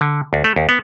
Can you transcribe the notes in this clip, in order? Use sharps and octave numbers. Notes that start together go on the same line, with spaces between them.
D3
D2
A3
D#2
B3